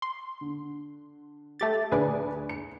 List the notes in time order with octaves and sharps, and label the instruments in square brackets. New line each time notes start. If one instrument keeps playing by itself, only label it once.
[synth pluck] C6
[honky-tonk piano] D3
[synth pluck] A3 G4 A6
[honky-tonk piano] D2 D4 G#5 [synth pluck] G#4 B4 D5
[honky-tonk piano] C#7